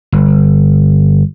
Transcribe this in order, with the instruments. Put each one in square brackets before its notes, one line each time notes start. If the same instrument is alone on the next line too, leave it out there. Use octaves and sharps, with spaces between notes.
[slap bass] G1